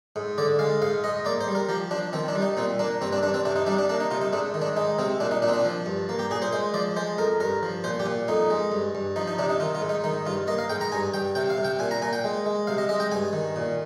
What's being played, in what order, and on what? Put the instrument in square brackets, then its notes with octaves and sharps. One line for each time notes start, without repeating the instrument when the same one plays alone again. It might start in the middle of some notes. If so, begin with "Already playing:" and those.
[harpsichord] G#2
D3 D5
G#3 F5
G#2 F5
G#2 D#5
A#3 D5
C5
G3
A#4
F3 G4
F3 D4
D#3 C4
D4
G3
D#4
A#2 C4
A#3 D4
G2 C4
D4
G2 D4
C4
C3 D4
D#4
G3 D4
D4
A#3 D4
D#4
C3 F4
D#4
G#2 D4
D#3
D4
G#3 D#4
C3 C4
A#2 D4
D#4
A#2 D4
C4
D4
F3
G2
A#3
G4
A#2 G#4
C5
G#3 C5
F3 D5
G#3 C5
F2 A#4
G2 A#4
F3
A#2 C5
G4
A#2
F2 D#4
G#3
G2
G2
F3 D#4
D#4
C3 D4
D#4
D#3 F4
F4
G#2
D#4
D#3 D#4
G2 F4
A#3 D#5
F5
G#2 G5
A#5
G2 G#5
G2 G5
C3 G5
F5
C3
G5
A#2 G#5
A#5
A#2 G#5
G5
G#3
G#3
C3 F5
D#5
G#3 D#5
G5
G2 G#5
D#3
A#2